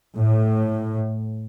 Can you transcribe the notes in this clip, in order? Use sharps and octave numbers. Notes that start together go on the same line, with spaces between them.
A2